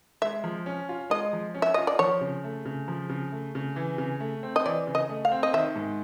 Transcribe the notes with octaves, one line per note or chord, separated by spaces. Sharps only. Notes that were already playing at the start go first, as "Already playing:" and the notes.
G#3 E5
F3
C#4
F4
G#3 D#5
F3
C#4
E5
F4 D#5
D5
F3 C#5
C#3
A3
C#3
F3
C#3
A3
C#3
E3
C#3
A3
C4
D#5
E3 D5
C#3
D#5
A3
F5
C4
D#5
D#3 E5
G#2